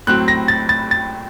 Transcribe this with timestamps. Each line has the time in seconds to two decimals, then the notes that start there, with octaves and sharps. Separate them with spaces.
0.07 A2 F#3 C4 F#6
0.28 A#6
0.48 A6
0.69 A6
0.91 A6